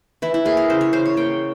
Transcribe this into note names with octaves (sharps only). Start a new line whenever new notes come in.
E3 E4
E4
A#3 G#4
A#4
C#3 C5
C#5
C#3 C5
C#5
A#3 G5